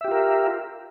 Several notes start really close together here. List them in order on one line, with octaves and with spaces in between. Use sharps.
E5 G4 F4 A#4